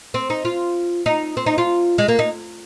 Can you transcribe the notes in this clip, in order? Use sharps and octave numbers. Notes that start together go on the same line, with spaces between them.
C4
D#4
F4
D#4
C4
D#4
F4
G#3
A#3
D#4